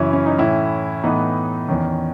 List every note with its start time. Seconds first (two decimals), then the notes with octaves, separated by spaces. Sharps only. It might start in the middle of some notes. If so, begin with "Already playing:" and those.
Already playing: F#2 C#3 E3 C#4 E4
0.13 C#4
0.26 D#4
0.38 A2 E3 C#4 E4
1.03 A2 E3 B3 D#4
1.69 E2 D#3 C#4